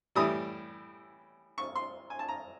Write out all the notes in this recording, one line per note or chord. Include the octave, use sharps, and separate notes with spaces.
A2 E3 G3 D#6
C#6
C6
G#5
A5
A#5